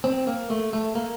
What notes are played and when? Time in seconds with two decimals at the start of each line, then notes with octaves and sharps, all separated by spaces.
0.04 C4
0.27 A#3
0.50 A3
0.73 A3
0.95 A#3